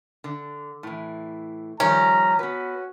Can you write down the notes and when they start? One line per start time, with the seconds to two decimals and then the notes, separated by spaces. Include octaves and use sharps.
0.24 D3
0.83 A2 E3
1.80 D#3 F3 G3 C#4 A#5
2.39 B3 F#4 B4